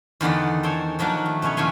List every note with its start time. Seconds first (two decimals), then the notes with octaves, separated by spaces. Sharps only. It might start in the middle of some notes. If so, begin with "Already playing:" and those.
0.21 E2 D3 D#3 B3 D5
0.63 A4 C5 C#5 G5 G#5
0.99 D#3 F3 F#3 A#3 D4
1.26 A3
1.42 B2 C#4 E4 C#5
1.57 E2 A#2 C#3 A3 G#5 C6